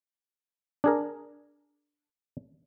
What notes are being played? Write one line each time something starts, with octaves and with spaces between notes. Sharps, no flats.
D4 G#4 A#4